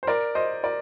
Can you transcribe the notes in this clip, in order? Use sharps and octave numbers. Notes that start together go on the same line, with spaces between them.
C5
A#4 D5
C5 D#5
A#4 D5